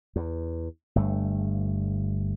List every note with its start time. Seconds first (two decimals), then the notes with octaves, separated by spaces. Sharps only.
0.16 E2
0.96 G1 G2 A3